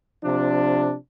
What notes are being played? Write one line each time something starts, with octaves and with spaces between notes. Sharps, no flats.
C3 F3 D4